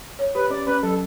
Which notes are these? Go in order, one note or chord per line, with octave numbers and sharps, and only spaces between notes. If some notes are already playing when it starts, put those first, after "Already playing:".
C#5
G4 B4
C#4 D5
C#4 B4
F#3 A4